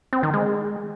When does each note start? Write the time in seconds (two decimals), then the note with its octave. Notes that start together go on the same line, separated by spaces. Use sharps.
0.13 C4
0.23 D#3
0.33 G#3